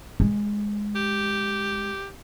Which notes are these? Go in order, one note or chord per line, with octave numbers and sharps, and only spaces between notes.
G#3
G4